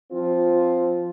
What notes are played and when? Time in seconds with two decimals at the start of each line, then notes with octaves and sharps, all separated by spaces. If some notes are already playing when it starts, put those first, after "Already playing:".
0.12 F3 C4 F4